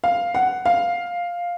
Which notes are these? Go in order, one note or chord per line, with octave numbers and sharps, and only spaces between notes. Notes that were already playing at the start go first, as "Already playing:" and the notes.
F5
F#5
F5